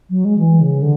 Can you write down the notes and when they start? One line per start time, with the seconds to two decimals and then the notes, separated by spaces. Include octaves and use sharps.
0.09 F#3
0.24 G#3
0.38 E3
0.60 C#3
0.81 D3